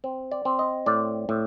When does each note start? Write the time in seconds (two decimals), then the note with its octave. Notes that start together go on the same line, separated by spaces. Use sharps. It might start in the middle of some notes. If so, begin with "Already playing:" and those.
0.04 C4
0.32 D5
0.45 C4
0.59 D#5
0.86 A2 D5
1.29 A2